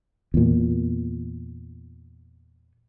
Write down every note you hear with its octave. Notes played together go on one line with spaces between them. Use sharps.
E2 A#2